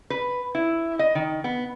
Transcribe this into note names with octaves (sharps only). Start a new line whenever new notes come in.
B4
E4
D#5
D#3
B3